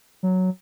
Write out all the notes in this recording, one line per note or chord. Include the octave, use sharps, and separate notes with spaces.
F#3